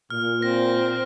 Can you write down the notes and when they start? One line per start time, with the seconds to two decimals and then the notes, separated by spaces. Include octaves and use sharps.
0.10 A#2 F6
0.42 C4 A#6